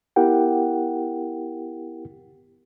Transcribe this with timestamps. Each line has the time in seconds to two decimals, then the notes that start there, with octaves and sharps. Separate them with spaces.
0.16 B3 E4 G4 A#4 F#5 G5